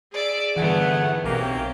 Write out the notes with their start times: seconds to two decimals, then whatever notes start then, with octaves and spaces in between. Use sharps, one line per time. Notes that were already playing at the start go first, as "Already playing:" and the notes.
0.13 G#4 D5 E5
0.57 G2 D3 E3 A3 B3 G#4 F#5
1.24 B1 C3 A#3 C#4 G4